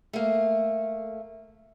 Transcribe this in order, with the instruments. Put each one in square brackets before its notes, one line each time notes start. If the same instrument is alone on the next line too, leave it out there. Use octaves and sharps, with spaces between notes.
[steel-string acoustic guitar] A3 A#3